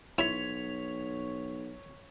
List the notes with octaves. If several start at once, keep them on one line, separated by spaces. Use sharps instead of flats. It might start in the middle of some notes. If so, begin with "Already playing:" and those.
B1 E4 C#5 B6 F7